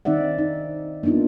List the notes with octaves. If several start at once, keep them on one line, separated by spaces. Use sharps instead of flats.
D#3 C4 D#4 D5 E5 F#5
D#4
A#3 B3 D4 D#4 F4